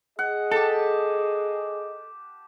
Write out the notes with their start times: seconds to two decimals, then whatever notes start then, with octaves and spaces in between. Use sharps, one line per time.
0.19 G#4 D#5 F#5
0.51 G4 A4 A5